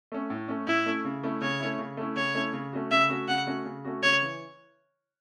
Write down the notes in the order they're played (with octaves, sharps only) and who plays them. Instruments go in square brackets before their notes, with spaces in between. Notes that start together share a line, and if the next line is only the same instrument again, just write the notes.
[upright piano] A3 C#4
A2
A3 C#4
[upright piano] A2 [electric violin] E4
[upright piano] A3 C#4
C#3
A3 C#4 E4
[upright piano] C#3 [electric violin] C#5
[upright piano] A3 C#4 E4
C#3
A3 C#4 E4
[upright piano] C#3 [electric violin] C#5
[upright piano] A3 C#4 E4
C#3
A3 C#4 F#4
[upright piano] C#3 [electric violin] E5
[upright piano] A3 C#4 F#4
[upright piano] C#3 [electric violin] F#5
[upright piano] A3 C#4 F#4
C#3
A3 C#4 F#4
[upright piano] C#3 [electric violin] C#5
[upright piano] E3